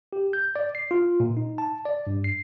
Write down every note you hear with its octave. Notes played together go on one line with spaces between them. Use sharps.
G4
G6
D5
C7
F4
A#2
D#4
A5
D5
G2
C7